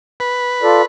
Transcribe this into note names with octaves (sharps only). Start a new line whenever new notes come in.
B4
F4 A4 D5